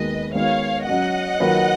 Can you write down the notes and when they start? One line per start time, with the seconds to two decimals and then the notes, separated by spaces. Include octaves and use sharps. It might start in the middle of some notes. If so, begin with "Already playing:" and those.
Already playing: D#2 D#3 G#3 B3 F#4 B4 D#5
0.34 D#3 G#3 B3 F#4 B4 C#5 F5
0.87 F#3 C#4 F#4 D#5 F#5
1.40 D#3 F#3 A#3 F4 B4